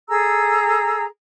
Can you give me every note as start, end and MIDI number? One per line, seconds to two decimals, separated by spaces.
0.08 1.04 68
0.08 1.04 69
0.08 1.04 82
0.08 1.04 88